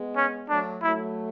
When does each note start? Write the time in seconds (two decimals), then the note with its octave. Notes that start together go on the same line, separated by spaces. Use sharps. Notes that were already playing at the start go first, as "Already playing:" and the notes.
Already playing: G#3 B3
0.16 C#4
0.49 F#3 A3 D4
0.82 F#3 A3 E4